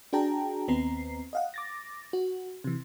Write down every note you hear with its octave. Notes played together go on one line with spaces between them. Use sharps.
D4 F#4 G#4 G5 A5 A#5
D#2 B3 C4 A#5 C7
D#5 F5 F#5
D6 A6 A#6
F#4
C3 E3